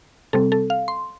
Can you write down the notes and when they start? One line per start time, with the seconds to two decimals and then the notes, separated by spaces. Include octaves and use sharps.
0.33 C3 G3 C4 A4
0.52 A4
0.70 F5
0.88 C6